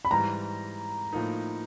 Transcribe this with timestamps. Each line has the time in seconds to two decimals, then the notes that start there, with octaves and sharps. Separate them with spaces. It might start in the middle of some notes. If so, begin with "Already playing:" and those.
0.05 B5
0.11 G#2 E3 G3 A#5
1.13 A2 F3 A#3 D#4